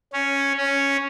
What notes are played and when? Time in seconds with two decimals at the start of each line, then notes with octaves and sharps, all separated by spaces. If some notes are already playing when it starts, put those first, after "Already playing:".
0.13 C#4
0.57 C#4